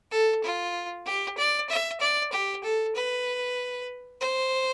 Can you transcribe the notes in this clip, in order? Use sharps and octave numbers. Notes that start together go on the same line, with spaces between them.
A4
F4
G4
D5
E5
D5
G4
A4
B4
C5